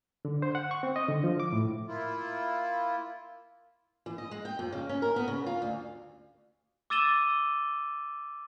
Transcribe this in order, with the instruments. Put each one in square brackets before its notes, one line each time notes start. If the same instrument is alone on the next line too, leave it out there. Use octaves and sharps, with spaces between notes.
[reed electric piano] D3
C5
F#5
C#6
C4
D#5
D3
F3
D6
A2
[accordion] A#3 E4 F4
[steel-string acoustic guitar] E3
D#5
G#3
G5
F2
C#3
C#4
A#4
B3
C#3
F4
D2
[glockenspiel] D6 E6 A6 D#7 E7 G7